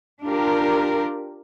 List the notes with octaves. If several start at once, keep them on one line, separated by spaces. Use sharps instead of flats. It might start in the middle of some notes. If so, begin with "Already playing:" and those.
D4 F4 G4 A#4